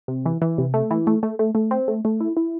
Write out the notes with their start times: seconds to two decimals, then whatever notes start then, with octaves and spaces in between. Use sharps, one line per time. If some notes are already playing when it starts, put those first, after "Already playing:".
0.08 C3
0.26 E3
0.42 E3
0.58 C3
0.74 A3
0.91 E3
1.07 A3
1.23 A3
1.39 A3
1.55 A3
1.71 C4
1.88 A3
2.05 A3
2.20 E4
2.37 E4